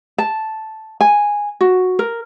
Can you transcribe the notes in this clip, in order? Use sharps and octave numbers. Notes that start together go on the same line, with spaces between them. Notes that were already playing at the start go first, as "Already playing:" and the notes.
A5
G#5
F#4
A#4